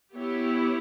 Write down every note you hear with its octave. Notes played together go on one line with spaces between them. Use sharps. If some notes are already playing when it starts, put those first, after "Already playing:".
B3 E4 G4 C#5